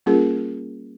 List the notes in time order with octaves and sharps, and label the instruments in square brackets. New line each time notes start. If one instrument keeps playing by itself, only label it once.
[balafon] G3 A#3 C#4 F4 G#4 A#4